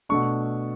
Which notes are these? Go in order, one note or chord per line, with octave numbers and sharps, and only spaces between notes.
B2 A3 D4 C#6